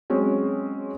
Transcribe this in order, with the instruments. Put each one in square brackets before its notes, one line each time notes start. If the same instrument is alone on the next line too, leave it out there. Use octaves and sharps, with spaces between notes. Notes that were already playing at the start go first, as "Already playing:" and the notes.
[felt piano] F#3 G#3 C4 C#4